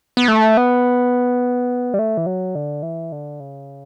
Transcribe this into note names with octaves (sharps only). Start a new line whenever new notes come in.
B3
A3
B3
G3
A3
E3
F#3
D3
E3
D3
C#3